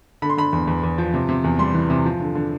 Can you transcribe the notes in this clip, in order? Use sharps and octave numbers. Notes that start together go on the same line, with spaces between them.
D3 B5
C6
D3 B5
E2
E2
E2
F3
C3
C3
E2
G3 C6
E3
C3
F3
D3
D3